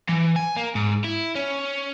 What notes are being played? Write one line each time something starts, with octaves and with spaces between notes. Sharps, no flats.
E3
G#5
A#3
G#2
E4
C#4